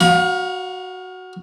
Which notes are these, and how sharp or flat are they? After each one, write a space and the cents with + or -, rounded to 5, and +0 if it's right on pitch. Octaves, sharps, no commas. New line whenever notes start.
F#4 +0 F5 +30 B5 -45